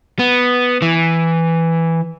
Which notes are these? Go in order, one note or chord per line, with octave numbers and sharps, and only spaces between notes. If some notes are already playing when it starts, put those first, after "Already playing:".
B3
E3